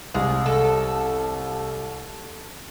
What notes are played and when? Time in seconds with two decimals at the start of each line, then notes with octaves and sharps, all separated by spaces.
0.14 C2 G#3
0.46 A4